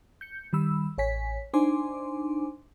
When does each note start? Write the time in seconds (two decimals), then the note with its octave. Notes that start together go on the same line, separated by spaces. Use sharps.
0.21 G6 C#7
0.53 D#3 G3 B5 E6
0.98 A1 C#5 G#5 B6
1.54 D4 D#4 C5 G#5 C6 D6